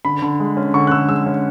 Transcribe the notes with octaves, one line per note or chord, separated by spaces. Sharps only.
D3 B5
D3
G#3
C#4
D3 C#6
F#6
D3 E6
G#3 E6
C#4